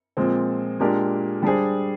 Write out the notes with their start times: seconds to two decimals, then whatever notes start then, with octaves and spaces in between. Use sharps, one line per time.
0.17 A#2 F3 G#3 C4
0.80 A#2 G#3 D4 G4 A#4
1.42 G3 D4 G#4 C5